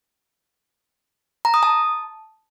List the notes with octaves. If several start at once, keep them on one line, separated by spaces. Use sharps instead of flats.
A#5
D#6
A5